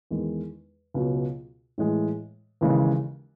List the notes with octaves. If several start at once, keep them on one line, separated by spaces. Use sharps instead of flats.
E2 D#3 G#3
C#2 B2 F#3
A2 E3 G#3
D#2 C#3 E3 G#3